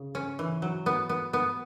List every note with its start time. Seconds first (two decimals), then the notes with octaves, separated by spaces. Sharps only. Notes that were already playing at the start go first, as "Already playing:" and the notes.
Already playing: C#3
0.15 C#4
0.39 E3
0.62 F#3
0.86 B3
1.09 B3
1.33 B3